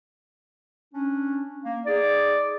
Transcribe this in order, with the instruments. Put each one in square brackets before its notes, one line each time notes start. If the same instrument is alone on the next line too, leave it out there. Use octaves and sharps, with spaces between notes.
[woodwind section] C#4 D4
A#3
[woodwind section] D#4 G#4 [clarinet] D5